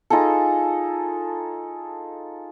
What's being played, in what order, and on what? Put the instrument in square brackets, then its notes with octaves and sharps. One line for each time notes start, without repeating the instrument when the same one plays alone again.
[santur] D#4 F4 G#4 A4